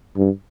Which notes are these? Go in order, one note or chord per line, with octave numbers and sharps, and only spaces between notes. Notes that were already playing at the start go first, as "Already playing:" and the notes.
G2